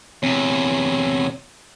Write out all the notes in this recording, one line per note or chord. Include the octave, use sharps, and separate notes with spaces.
E2 C3 C4 C#5